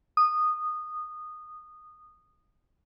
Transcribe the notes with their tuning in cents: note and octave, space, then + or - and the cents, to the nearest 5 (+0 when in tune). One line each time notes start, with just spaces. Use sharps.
D#6 -15